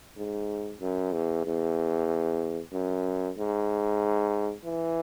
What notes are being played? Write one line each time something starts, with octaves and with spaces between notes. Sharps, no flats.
G#2
F#2
E2
E2
F#2
G#2
E3